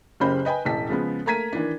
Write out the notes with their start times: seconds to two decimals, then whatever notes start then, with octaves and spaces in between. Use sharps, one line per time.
0.20 F#1 C#3 G4 C5 B5 G6
0.45 B4 D#5 G5 G#5 B5
0.65 E1 A1 A5 B6
0.89 C#3 F3 G#3 B3
1.26 A3 A#3 A#5 G#6 B6 D#7
1.53 D#3 E3 D4